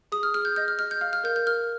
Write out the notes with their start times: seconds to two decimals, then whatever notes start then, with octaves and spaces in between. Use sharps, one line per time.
0.12 G#4 D#6
0.23 F6
0.34 G#4 F6
0.45 G6
0.56 D#5 G6
0.68 F6
0.79 D#5 F6
0.91 G6
1.01 F5 F6
1.13 F6
1.24 A#4 G6
1.36 G6
1.46 A#4 F6